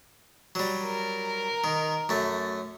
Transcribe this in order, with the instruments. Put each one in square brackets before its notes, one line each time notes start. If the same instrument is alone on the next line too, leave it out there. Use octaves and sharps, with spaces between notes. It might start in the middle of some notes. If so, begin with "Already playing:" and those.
[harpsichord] F#3 G3
[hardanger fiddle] A#4
[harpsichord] D#3
F#2 A3